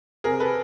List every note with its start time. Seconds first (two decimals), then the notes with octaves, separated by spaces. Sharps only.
0.24 C3 G#4 A#4
0.40 A4 B4